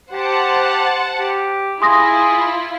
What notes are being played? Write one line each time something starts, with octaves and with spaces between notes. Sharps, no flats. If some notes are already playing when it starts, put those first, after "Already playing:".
G4 C5 F#5 A5
G4
E4 F4 G#4 C6 D#6 A#6